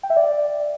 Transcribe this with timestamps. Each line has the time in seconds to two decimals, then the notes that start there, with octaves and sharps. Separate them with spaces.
0.03 G5
0.10 E5
0.17 D5